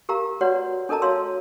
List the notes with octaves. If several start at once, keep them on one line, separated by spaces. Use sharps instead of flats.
G4 A#4 F5 A#5
F#4 B4 C#5 D5 F#5
D4 A4 A#4 D#5 A5 A#5
F#4 C#5 F5 C6 E6